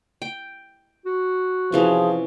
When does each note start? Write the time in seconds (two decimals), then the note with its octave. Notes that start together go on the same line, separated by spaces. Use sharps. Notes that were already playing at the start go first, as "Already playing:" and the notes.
0.22 G5
1.06 F#4
1.72 C3 E3 F3 C#4 G#4